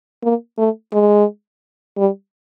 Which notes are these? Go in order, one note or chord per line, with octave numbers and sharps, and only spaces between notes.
A#3
A3
G#3
G3